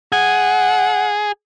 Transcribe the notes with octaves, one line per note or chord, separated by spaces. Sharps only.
G#4 F#5